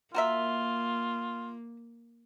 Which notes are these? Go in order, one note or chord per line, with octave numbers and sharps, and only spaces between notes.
A#3 F4 F#4 A#4 E5